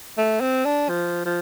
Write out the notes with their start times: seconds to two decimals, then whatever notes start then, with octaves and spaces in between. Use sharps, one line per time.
0.17 A3
0.41 C4
0.65 D4
0.89 F3
1.25 F3